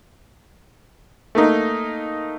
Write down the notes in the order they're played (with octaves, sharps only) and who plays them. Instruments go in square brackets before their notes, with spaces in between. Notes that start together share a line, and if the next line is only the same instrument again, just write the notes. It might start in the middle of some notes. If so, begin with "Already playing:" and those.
[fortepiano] A3 A#3 D#4